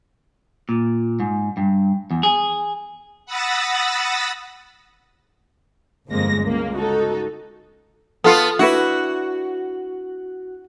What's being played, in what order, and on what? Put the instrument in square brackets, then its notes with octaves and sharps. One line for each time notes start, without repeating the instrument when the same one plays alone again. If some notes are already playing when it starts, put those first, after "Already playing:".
[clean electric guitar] A#2
G#2
G2
E2
G#4
[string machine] F#5 B5 D#6 E6 A6 A#6
[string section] G1 F2 G#3 A#3 A#6
C#2 A#3
D#4 F#4 A4
[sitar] B3 F4 [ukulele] A4
[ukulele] D4 E4 B4 [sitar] F#4